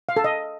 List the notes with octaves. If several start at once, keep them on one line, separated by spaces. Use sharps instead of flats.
F5
A4
D#5